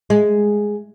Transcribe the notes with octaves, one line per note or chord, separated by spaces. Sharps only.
G#3